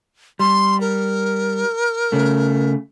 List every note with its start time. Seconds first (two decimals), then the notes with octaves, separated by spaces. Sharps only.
0.39 G3 C6
0.80 A#4
2.12 C#3 A3